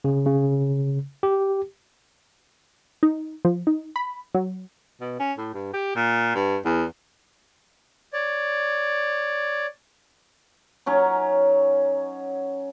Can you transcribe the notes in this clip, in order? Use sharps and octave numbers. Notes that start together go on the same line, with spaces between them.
C#3
C#3
G4
D#4
F3
D#4
B5
F#3
B2
C#4
A2
G2
G4
A#2
G2
E2
C#5 D5
F#3 C#4 D#4 C#5